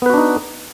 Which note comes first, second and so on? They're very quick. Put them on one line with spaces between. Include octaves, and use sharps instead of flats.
B3 B4 F#4 D4 D#4